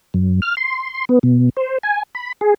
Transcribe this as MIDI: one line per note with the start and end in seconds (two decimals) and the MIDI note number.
0.14 0.40 42
0.42 0.55 89
0.57 1.05 84
1.09 1.19 59
1.23 1.49 47
1.57 1.78 72
1.83 2.03 80
2.15 2.32 83
2.41 2.54 68